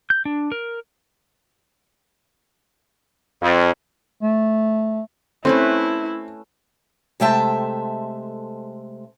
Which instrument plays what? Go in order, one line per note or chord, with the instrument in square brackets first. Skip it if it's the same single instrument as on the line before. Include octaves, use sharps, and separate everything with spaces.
[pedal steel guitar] G6
D4
A#4
[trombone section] F2
[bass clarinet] A3
[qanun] A3 C#4 B4 [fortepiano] C4 [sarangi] E4
[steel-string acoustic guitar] C3 G#3 A3 E5 G5 A5